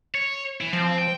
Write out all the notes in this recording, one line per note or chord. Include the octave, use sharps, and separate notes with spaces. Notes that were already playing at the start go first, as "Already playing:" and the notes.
C#5
E3 E4
F3 C4
G5